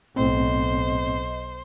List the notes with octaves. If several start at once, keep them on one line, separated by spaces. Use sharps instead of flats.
B1 A2 C4 C5 D#5